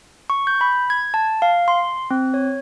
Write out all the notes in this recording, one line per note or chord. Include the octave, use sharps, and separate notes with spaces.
C#6
G6
B5
G#6
A5
F5
C6
C4
C#5